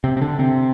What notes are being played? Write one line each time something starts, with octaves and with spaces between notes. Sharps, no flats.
C3 C4
C4
D3 D4
C3 C4